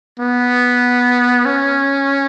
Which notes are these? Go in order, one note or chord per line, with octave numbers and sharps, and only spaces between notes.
B3
C#4